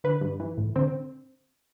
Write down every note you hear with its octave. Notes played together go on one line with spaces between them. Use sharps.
D3 B4
G2
E3
A2
D3 C4